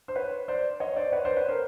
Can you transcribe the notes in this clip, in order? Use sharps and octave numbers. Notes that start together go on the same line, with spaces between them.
C5
B4 C#5
C5 D5
C#5 D#5
C5 D5
B4 C#5
C5 D5
B4 C#5
A#4 C5